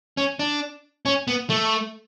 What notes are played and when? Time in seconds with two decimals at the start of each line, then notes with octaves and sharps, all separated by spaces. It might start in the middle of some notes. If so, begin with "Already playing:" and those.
0.17 C#4
0.39 D4
1.06 C#4
1.28 B3
1.50 A3